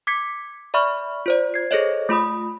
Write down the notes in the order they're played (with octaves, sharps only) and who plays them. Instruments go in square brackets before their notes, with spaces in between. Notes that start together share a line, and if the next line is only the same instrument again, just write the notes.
[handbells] D6 G#6 B6 C#7
D5 E5 B5 C#6 F6
F4 C5 D5
G#6 C7
G#4 A4 C5 C#5 D#5
A3 F4 B5 D#6